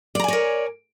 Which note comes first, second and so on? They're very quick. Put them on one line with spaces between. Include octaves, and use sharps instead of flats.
D5 A#5 G#5 C#5 A#4